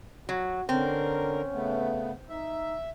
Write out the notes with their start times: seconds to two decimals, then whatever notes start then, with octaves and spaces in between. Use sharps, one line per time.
0.29 F#3 F#4
0.69 D3 C4 C#4 A#4
1.53 C#3 A3 B3
2.29 D#4 E5